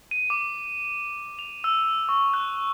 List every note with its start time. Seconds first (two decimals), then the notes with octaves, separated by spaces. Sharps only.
0.11 D#7
0.30 D6
1.39 F7
1.64 E6
2.09 C#6
2.34 F#6